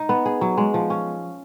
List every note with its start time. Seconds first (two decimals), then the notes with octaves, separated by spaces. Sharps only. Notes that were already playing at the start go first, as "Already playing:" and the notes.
Already playing: D#4
0.09 B3
0.26 G#4
0.41 F#3
0.57 G#3
0.74 F3
0.90 C#4